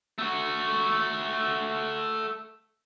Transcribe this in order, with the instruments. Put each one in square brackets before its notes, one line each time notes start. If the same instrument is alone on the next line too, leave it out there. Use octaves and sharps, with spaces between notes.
[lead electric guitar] A3 F#4